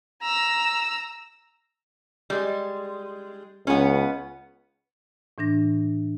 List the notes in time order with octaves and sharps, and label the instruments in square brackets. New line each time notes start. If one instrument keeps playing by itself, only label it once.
[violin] A#5 E6
[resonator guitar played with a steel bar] G3 G#3
[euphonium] C#2 [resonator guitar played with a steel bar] B3 C#4
[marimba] A2 E3 D4 A#6